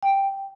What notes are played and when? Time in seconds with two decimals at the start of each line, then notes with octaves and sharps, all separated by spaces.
0.03 G5